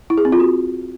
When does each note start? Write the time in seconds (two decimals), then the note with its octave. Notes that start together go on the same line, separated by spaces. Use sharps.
0.10 E4
0.18 G#4
0.25 C4
0.32 F4
0.40 F#4